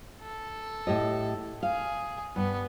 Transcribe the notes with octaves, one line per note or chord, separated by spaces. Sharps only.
A4
A2 G4 D#5
G#4 F5
G2 B3